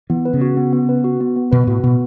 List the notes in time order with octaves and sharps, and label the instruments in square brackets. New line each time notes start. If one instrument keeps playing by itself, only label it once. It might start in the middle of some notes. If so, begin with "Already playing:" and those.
[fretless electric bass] E3 [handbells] B3
[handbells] B4
[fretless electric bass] C#3
[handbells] F#4
B3
B3
B4
F#4
B3
B3
[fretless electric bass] B2 [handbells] B4
[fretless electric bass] A2 [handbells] F#4
[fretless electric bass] B2 [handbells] B3